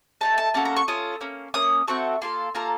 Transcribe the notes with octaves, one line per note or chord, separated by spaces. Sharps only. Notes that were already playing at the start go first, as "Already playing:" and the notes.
A3 D#4 A4 A5
A5
A#3 C#4 F#4 A4 A5
A#5
C#6
C#4 F4 A4 D#6
A#3 C#4
A#3 C#4 D#6
A3 C4 F#4 A4 C#6
A#3 F4 A4 C6
A#3 F4 A4 A#5